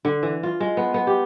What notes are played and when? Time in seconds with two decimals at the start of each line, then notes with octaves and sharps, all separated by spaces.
0.05 D3
0.23 E3
0.43 F4
0.60 G#3
0.77 B3
0.94 B3
1.07 G4